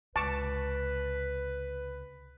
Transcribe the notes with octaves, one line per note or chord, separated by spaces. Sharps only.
C#2 C3 B4 A5 C#6 D6